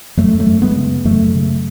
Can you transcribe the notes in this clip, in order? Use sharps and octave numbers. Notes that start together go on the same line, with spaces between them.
F#2 F#3 A3
F#3 A3
F#2
G#3 B3
C#3
F#2 F#3 A3
C#3